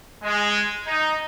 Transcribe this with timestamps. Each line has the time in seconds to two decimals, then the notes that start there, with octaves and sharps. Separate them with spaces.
0.23 G#3
0.86 D#4